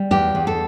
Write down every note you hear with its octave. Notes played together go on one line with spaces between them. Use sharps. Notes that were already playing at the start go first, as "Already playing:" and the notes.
Already playing: G3
E2 G4
E2
A4